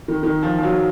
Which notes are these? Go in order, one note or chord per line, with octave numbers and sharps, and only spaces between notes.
D#3
D#3
F3
F3
F#3